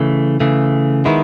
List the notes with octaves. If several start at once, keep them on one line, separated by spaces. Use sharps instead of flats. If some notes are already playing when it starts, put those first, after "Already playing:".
Already playing: C#3 E3 A3
C#3 E3 A3
D#3 G#3 B3 E4